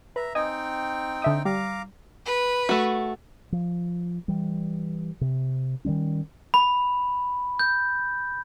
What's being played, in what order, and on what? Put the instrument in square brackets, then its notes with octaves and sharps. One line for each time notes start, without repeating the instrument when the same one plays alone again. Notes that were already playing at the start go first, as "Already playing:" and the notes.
[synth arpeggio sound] B4 [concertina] E5 A#5
[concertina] C4 D#4 G5 [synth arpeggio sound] D#5 G#5 D#6
[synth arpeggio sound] D3 E5 D#6
[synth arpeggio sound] G3 [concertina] F5 A#5 D6
[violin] B4
[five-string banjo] A3 F#4
[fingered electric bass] F3
E3 G3
C3
D#3 F#3 G3 C#4
[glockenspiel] B5
G6